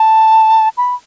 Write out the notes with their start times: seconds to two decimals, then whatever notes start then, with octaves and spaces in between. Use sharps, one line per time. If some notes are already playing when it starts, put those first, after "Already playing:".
Already playing: A5
0.77 B5